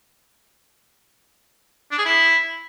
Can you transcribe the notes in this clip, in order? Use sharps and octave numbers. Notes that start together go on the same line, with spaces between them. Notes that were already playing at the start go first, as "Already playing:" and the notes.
D4
G#4
E4